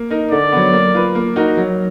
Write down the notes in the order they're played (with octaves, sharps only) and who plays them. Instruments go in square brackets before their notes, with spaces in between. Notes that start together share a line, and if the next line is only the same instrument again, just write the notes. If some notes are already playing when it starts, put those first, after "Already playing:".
Already playing: [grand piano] A#3
D#4 A#4
[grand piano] D3 [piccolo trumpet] D5
[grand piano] F#3 B3
A#3
F4 B4
A#3
D#4 F#4 A#4
F#3